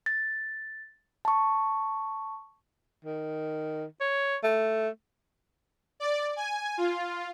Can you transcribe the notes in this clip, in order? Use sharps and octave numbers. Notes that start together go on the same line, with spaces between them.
A6
A5 C#6
D#3
C#5
A3
D5
G#5
F4